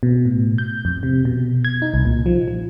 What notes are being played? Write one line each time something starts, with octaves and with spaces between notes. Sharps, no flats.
B2
A2
G6
F2
C3
B2
G#6
D#4
C2
A#2
F3
F3